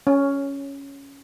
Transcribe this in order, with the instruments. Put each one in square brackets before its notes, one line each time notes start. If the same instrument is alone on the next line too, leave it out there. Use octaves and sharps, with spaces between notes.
[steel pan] C#4